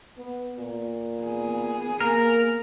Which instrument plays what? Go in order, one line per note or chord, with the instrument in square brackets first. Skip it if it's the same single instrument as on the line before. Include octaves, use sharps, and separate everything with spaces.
[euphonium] B3
A#2
[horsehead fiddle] B3 G#4
[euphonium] A#3 [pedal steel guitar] A#4